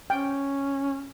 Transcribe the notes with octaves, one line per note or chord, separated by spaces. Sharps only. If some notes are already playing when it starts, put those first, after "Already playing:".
C#4 G5